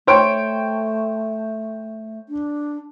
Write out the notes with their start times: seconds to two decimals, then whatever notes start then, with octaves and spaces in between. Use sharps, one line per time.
0.07 A3 C5 C#5 G5
2.29 D4